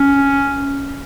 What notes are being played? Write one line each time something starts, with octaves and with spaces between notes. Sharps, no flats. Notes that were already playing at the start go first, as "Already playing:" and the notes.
Already playing: C#4